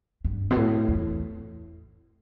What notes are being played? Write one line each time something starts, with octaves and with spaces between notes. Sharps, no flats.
G2
B2
A2
E2